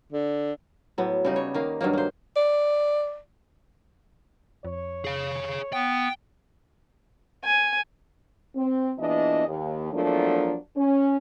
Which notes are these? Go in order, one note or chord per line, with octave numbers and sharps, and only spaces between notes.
D3
A2 F#3 B3
C#3 G3 D#4
C#5
D#3 A#3 F5
G2 D#3 F#3 A#3
A#3 C5
D5
F2 C#5
G#4 F5
B3 G5
G#5
C4
E2 A#2 E3 D4 D#5
D#2
E2 F3 F#3 A3 A#3 D4
C#4